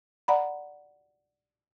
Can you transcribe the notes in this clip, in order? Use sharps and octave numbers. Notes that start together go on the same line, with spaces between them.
D5 F#5 A#5 B5